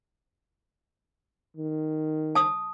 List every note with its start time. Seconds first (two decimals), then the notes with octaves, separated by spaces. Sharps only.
1.57 D#3
2.35 A5 D#6